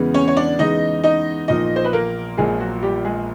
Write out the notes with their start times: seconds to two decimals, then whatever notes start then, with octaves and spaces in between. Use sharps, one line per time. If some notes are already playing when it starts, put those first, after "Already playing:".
Already playing: E2 C#3 E3 G#3 B3
0.14 C#4 C#5
0.28 C#5
0.37 D4 D5
0.59 E2 C#3 E3 G#3 B3 D#4 D#5
1.04 D#4 D#5
1.48 A#1 A#2 F3 D#4 D#5
1.76 C5
1.85 B4
1.93 A#3 A#4
2.37 A#1 A#2 F3 G#3 G#4
2.60 F#3 F#4
2.83 G3 G4
3.05 G#3 G#4